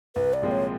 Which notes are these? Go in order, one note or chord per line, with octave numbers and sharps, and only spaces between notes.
C2 B4
D5
A#2 F3 G#3 C4
C#5